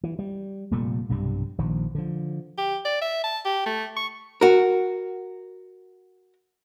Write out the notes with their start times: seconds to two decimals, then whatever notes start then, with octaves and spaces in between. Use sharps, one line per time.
0.04 E3
0.19 G3
0.71 F1 A#2 G3 A3
1.09 B1 G2 C3 G3
1.59 A#1 D#3 F3
1.95 D3 F3
2.58 G4
2.85 D5
3.02 E5
3.24 A5
3.46 G4
3.66 A3
3.97 C#6
4.41 F#4 A#4